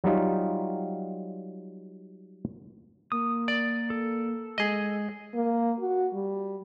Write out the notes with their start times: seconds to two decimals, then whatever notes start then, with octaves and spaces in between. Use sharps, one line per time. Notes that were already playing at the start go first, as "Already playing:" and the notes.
0.04 F#3 G3 D#4 F4
3.12 A#3 D#6
3.48 D5
3.90 A4
4.58 G#3 G#4 D#5
5.34 A#3
5.81 F#4
6.14 G3